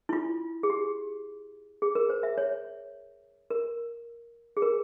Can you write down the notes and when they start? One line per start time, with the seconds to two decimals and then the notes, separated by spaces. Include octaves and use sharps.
0.09 E4
0.13 F4
0.63 G#4
0.70 G4
1.82 G#4
1.95 A#4
2.10 C5
2.23 E5
2.38 C#5
3.50 A#4
4.57 G#4
4.62 A#4